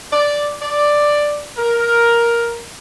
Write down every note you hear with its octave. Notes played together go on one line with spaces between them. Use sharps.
D5
D5
A#4